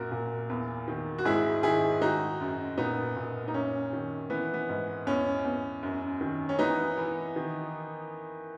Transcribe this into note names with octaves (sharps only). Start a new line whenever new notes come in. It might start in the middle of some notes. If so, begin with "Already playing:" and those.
Already playing: F#2 A#2 F#4 A#4
A#2
E2
D#3
F#4
G#2 E4 G#4
D#3 E4 G#4
D#3 D#4 F#4
F#2
A#2 B3 D#4
A#2
D#4
F#2 C#4
D#3
E3 B3
B3
G#2
E2 C#4
E2
F#2
D#3
C#4
E3 B3 D#4
E3
D#3